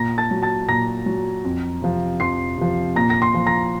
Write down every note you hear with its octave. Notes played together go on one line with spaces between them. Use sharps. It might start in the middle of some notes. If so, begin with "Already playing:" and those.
Already playing: A#2 A#5 A#6
A5 A6
F#3
A5 A6
A#2 A#5 A#6
F#3
F2
C3 F3
F2 C6 C7
C3 F3
A#2 A#5 A#6
A#6
C6 C7
F3
A#5 A#6